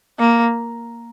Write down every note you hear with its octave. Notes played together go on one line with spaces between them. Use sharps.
A#3